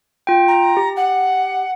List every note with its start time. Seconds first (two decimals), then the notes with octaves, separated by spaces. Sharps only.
0.27 F4 G5
0.47 A#5
0.77 G4
0.96 F#5